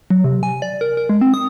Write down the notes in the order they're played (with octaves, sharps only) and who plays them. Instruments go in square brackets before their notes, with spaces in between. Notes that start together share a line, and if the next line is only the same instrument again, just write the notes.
[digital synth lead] F#3
C3
G#5
D5
A#4
A#4
G#3
C4
D#6